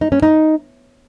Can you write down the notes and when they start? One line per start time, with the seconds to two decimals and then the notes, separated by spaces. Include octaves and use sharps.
0.01 D#4
0.12 C#4
0.22 D#4